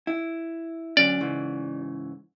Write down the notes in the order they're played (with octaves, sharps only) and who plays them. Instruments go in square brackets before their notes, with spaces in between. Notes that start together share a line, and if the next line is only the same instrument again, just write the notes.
[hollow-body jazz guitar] E4
[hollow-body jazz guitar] D2 F#3 C#4 [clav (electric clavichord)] D5
[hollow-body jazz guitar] G#2 C#3 E3